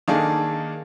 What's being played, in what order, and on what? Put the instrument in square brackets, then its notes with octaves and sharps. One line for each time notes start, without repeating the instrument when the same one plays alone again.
[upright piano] D#3 A#3 D4 G#4 A4